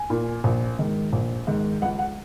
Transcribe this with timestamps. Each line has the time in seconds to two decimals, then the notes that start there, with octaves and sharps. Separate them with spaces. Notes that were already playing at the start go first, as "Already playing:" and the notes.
Already playing: G#5
0.10 A#2
0.44 A#1
0.79 G#2 D#3
1.13 A#1
1.47 G#2 D#3
1.82 C#2 F#5
1.99 F#5